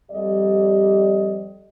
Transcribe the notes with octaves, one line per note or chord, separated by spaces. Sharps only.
F2 G3 G4 D5 D#5